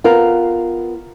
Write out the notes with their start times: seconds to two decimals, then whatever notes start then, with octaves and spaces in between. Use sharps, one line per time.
0.04 B3 F4 A#4